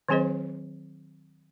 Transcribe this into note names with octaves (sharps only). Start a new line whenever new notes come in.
D#3 F#3 C4 G#4 C5 D#5